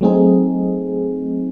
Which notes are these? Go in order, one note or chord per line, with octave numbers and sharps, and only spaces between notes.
F#3 A3 C4 D#4 G#4